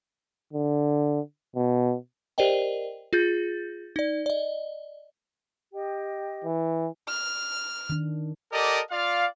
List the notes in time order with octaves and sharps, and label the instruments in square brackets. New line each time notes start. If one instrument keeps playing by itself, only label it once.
[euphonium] D3
B2
[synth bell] G4 A#4 C5 D5 D#5 G5
F4 G#4 G6 A6
D#4 D5
D5 D#5
[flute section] G4 D#5 G5
[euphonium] E3
[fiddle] F6
[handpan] D#3 D4
[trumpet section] G4 A4 A#4 D5 D#5
F4 D5 F5